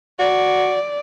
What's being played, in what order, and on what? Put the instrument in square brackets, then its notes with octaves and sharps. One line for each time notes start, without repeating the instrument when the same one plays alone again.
[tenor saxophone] F#4 [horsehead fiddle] D5